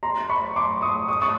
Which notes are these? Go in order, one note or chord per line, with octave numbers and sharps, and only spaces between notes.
A#5 C6
B5 C#6
C6 D6
C#6 D#6
C#6 D#6
C#6 D#6